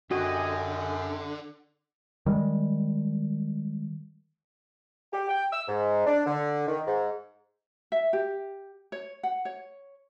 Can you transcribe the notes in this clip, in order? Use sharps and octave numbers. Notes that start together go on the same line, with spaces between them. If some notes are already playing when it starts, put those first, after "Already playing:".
F#2 D3 F#4 G4 D#5 G#5
D#3 G3 G#3
G4
G5
E6
G#2
D4
D3
D#3
G#2
E5
G4
C#5
F#5
C#5